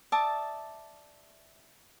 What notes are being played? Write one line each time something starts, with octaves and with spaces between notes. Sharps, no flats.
D5 E5 A5 D#6